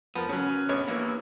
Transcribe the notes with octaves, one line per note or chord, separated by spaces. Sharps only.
F3 B3 A#4
C#3 F#3 C#4
A#1 B3 C#5
E3 A#3